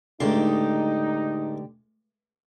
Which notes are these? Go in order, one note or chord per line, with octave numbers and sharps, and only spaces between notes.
C#2 A2 D3 D#4 G4 C6